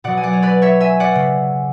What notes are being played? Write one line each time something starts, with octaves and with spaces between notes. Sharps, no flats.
B2 F#3 D5 F#5
G#5
D5 F#5
C#5
B4 D5
C#5 E5
E5 G#5
D5 F#5
C#3